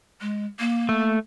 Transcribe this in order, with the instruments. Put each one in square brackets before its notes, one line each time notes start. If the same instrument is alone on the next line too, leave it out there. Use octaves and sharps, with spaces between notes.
[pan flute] G#3
A#3
[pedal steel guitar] A3